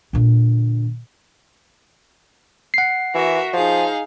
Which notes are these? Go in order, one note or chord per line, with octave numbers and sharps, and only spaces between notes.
A#2 D3
F#5 C7
E3 F#4 A#4 E5
F3 D#4 G#4 F5